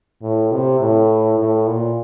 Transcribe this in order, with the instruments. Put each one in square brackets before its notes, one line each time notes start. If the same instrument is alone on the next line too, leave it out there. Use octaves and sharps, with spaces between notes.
[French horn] A2
C3
A2
A2
A#2